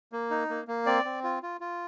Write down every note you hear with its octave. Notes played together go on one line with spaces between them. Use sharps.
A#3
D#4
A#3
A#3
C4 D5
C4
F4
F4
F4